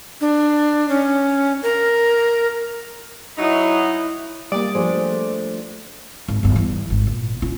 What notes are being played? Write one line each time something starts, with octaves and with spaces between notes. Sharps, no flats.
D4
C#4
A#4
F#3 D#4 E4
G3 A#3 D5 D#6
F3 A3 D4 G#4 C5
G#1
G1 G2
E3 G3
G#1
A#2
C#4 F4